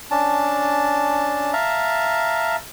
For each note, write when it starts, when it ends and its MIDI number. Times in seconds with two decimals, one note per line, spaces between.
0.11 1.53 61
0.11 1.53 62
0.11 1.53 81
1.53 2.56 76
1.53 2.56 77
1.53 2.56 81
1.53 2.56 82